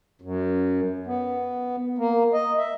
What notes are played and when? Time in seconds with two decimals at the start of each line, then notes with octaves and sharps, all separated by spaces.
0.21 F#2
1.07 B3
1.98 A#3
2.33 D#5
2.57 E5